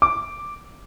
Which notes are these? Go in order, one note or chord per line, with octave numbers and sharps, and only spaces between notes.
D6